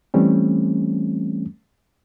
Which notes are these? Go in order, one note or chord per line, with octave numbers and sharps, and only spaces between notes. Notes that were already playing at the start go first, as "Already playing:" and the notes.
E3 G3 A3 C4 C#4